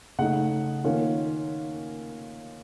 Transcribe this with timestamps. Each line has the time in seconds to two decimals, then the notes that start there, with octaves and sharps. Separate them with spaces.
0.19 C#3 A3 D#4 F#5
0.84 D#3 A#3 C#4 F4